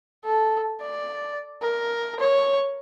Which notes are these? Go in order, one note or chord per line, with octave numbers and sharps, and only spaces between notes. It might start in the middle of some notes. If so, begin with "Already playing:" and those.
A4
D5
A#4
C#5